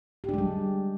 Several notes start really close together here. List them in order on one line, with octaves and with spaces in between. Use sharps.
G4 D4 G#3 G3